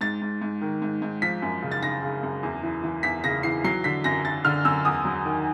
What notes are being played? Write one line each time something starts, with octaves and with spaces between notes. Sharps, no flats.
G#2 A6
G#2
G#2
D#3
G#2
G#2
F3 B6
F#2
C#3
A6
C#3 A#6
C#3
F#2
E2
E3
E3
E2 B6
C#3 A#6
E3 C7
F#3 C7
D3 B6
F#2 A#6
F#2 A6
D3 F6
F#2 E6
E2 D#6
F#3
D#3